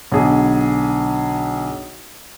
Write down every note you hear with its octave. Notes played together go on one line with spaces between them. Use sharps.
B1 D3 G#4